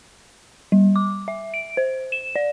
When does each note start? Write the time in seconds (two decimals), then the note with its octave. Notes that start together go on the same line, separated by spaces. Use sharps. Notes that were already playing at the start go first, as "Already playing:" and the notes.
0.72 G3
0.96 D6
1.28 E5
1.54 D7
1.77 C5
2.12 E7
2.36 D5